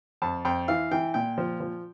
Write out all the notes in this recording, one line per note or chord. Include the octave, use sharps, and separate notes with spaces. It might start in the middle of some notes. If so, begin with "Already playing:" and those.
F2 A5
F2 G5
E3 F5
E3 G5
A#2 G5
F3
F3